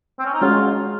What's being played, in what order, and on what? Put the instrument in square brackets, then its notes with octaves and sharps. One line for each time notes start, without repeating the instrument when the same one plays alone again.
[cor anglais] C4
C#4
D#4
[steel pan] G#3 C#4 F#4 C#5 [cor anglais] F4